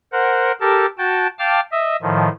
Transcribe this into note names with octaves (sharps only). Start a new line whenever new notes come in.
A#4 C5 F#5
G4 A4 A#4 A5
F#4 G5 A5
F5 G5 A5 D6 F6
D#5 E5
A2 D#3 F3